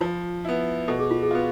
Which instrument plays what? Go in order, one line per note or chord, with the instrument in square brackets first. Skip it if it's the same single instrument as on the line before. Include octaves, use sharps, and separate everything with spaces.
[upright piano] F3 [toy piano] F4
[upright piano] B3 E4
[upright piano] B2 [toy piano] A4
[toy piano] G#4
F4
G#4
[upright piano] B3 F4